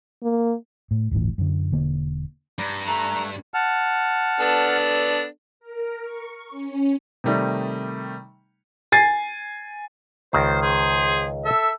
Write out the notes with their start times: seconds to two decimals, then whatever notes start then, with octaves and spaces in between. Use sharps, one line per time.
0.23 A#3
0.91 A2
1.11 D1 G1 A2 E3
1.38 F#2 D3
1.71 E1 D3 A#3
2.59 G2 D5 A#5 B5
2.87 A3 A#5 F#6
3.54 F#5 A5 F6
4.40 B3 D4 A4
5.60 A#4
6.03 C#6
6.49 C#4
7.24 C3 D#3 G3 A3 D#4
8.92 G#5 A6 C7
10.33 C#2 D#3 C5
10.62 G#4 C5
11.45 A4 E5